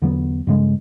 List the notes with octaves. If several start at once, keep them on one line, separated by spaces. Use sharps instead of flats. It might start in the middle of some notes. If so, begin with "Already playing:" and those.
E2 D3 F#3 B3
G2 C#3 G#3